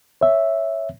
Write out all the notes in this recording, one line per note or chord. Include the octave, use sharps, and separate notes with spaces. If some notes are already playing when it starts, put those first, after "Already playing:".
C#5 E5